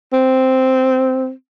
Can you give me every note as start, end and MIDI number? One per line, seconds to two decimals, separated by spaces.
0.13 1.31 60